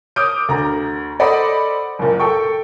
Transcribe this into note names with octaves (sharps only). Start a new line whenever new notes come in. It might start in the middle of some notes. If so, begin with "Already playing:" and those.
D6 D#6 F6 G6 D7
D2 F#4 A#5
A4 C5 D5 D#5 F#5 B5
F#1 A#2
A4 G5 C#6